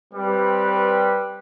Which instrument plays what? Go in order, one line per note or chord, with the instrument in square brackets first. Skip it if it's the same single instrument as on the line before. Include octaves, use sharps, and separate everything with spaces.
[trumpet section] G3 C4 B4